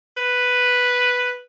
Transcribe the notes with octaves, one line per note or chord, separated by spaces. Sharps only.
B4